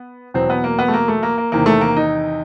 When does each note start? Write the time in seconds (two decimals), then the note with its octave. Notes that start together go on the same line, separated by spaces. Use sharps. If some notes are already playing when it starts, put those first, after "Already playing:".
Already playing: B3
0.34 E2 B2 F#3 C4
0.50 B3
0.64 A#3
0.79 B3
0.88 A3
0.93 A#3
1.08 A3
1.23 A#3
1.38 A#3
1.52 E2 C3 D#3 A#3
1.66 A3
1.81 A#3
1.96 D#4